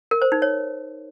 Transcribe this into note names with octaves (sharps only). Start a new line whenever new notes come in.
A#4
C5
D#4
C#5